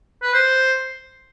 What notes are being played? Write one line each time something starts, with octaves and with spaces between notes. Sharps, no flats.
B4
C5